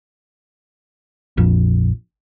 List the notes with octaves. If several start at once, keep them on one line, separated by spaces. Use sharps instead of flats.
A#1 F2